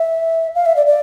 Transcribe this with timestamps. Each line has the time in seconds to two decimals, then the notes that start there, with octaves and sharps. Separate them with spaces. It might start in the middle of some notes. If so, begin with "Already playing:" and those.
Already playing: E5
0.55 F5
0.66 E5
0.76 D5
0.86 D5